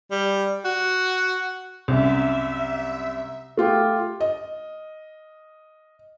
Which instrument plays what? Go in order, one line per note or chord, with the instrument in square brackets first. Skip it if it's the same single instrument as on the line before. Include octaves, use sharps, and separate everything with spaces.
[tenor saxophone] G3
F#4
[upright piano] C2 F#2 [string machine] E5
[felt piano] A3 F4 G4
D#5